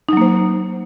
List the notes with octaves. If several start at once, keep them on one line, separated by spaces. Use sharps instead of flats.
F#3 A#3 D#4 C5